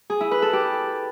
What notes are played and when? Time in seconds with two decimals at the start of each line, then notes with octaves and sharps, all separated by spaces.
0.10 G#4
0.21 E4
0.31 B4
0.42 A4
0.53 G4